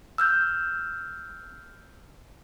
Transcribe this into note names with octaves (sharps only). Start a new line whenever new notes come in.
E6 F6 G6